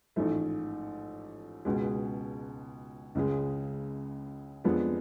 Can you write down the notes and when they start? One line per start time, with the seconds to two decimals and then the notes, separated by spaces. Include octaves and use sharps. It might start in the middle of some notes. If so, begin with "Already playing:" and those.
0.16 A1 G#2 F3 A3
1.65 C#2 B2 G#3
3.15 C#2 C#3 G#3
4.64 F2 F3 G#3 B3 D4